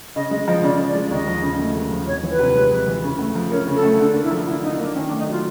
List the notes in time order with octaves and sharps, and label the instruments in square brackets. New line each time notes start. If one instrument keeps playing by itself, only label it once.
[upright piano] C#3 [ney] D#5
[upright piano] G#3 [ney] D#5
[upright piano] F3 [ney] D#5
[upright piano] C#3 [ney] D5
[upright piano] C#3
[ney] D5
[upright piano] G#3
[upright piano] D#2 [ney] D#5
[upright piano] F3
C#3
A3
D#2
F3
[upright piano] F2 [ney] C#5
[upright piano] E3
[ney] B4
[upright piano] C3
G#3
F2
E3
C#3
A3
F3
[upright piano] C#4 [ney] A#4
[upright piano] C#3
[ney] A4
[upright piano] A3
[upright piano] D3 [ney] A4
[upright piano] A#3
[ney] E4
[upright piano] F3
[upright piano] D3 [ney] E4
[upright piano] D3 [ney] D#4
[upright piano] A#3 [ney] D4
[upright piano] D#3 [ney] C#4
[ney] D4
[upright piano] A3
[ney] D#4
[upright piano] F#3
[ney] F4